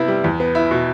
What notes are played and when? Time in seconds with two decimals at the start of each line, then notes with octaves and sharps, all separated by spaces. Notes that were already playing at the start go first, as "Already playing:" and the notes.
Already playing: C3 B3 E4
0.08 G3
0.24 E2
0.40 B3
0.55 E4
0.71 B2